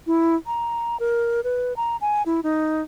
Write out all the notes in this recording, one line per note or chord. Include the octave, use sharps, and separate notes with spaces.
E4
A#5
A#4
B4
A#5
G#5
E4
D#4